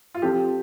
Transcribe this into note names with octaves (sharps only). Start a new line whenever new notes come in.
F4
F3 C4 G4 A4